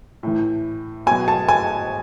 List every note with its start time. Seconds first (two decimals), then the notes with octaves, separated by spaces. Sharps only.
0.23 A2 E3
1.06 B2 F#3 G#5
1.28 A5
1.49 G#5